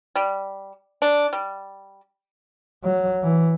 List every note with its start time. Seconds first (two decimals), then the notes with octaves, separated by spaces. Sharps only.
0.16 G3
1.02 D4
1.33 G3
2.84 F#3
3.23 E3